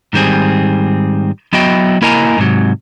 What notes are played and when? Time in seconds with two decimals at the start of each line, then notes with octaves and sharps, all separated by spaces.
0.13 G#2 D#3 G3 C4 G#4
1.53 F#3 B3 E4 F#4 D#5 G5
2.02 A#3 E4 A#4 D#5 G#5 A#5
2.38 G#2 C3 F#3